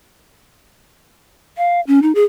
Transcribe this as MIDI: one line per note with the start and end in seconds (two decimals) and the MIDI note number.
1.57 1.81 77
1.87 2.02 61
2.02 2.12 63
2.15 2.24 68